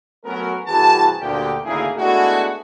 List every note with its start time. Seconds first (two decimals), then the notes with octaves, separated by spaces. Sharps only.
0.24 F#3 A3 B3 C#4 F#4 A#4
0.67 C2 E3 F#4 G#4 A#4 A5
1.20 D2 A#2 G4
1.64 G#1 D2 C#3 A#3 E4 G#4
1.96 G#3 A3 B3 D4 E4 F#4